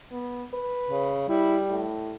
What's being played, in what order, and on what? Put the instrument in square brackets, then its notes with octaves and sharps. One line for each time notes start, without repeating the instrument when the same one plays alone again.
[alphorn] B3
B4
[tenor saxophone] C#3
[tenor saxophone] G3 [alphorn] E4
[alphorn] A2